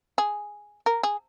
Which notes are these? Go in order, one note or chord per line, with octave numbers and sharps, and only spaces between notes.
G#4
A#4
G#4